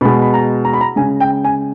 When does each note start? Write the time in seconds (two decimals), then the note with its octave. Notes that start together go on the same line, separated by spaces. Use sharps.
0.01 B2 G#3 B5
0.22 B5
0.34 A#5
0.65 A#5
0.73 B5
0.81 A#5
0.96 C#3 G#3 G#5
1.20 G5
1.44 G#5